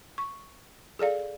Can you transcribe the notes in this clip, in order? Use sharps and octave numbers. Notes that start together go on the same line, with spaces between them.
C#6
G#4 A4 D5 F5